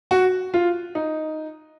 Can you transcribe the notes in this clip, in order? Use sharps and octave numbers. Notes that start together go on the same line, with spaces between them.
F#4
F4
D#4